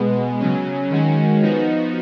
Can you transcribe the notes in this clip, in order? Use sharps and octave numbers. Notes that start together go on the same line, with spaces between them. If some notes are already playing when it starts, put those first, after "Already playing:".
Already playing: B2 G#3 B3
C#3 F#3 C#4
D#3 G#3 C#4 F#4
F3 B3 D#4 F#4